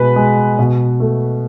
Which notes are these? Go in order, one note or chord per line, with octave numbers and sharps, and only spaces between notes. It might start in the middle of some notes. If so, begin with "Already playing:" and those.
Already playing: B2 G#3 B4
G#3
B2
A3